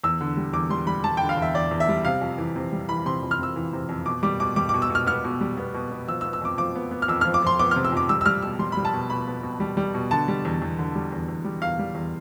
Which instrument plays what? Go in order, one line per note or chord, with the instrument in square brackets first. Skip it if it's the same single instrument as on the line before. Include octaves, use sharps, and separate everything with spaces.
[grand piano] E2 E6
D3
G3
E2 D6
G3 C6
G3 B5
G3 A5
D3 G5
F5
E2 E5
E2 D5
E2
E5
G3
C3 F5
F2
E3
C3
G3
E3 B5
C3 C6
F2
F6
C3 E6
E3
C3
F2
B2 D6
G3 D6
B2 D6
G3 D6
B2 D6
E6
B2
F6
B3 F6
B2
G3
B3
B2
B3
F3 E6
E6
B3
E6
F2 D6
F3 D6
B3
B3
F6
F2 E6
F3 F6
D6
F3 C6
B3 D6
C3 F6
E6
F2 D6
G3 E6
E6
G3 F6
B2 E6
G3 C6
G3 B5
A5
B2
B2 B5
B3
B2
G3
G3
B2
D3 A5
G3
E2
E2
D3
G3
E2
E2
G3
E2 F5
G3
E2